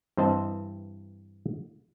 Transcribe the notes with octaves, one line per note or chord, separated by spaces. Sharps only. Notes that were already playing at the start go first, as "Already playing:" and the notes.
G2 E3 C4 C5 D#5 A5